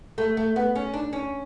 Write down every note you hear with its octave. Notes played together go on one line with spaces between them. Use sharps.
A3
A3
B3
C#4
D4
C#4